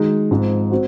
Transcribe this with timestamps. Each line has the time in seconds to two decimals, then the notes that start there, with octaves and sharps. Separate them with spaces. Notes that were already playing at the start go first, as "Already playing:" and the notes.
Already playing: D#3 G#3 D#4 F#4
0.31 G#2 F3 C4
0.71 C4 F#4